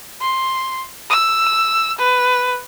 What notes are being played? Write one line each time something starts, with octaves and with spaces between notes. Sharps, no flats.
C6
E6
B4